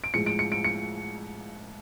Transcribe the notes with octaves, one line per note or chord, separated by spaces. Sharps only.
D7
A2 F3 G#3 C#7
D7
C#7
D7
C#7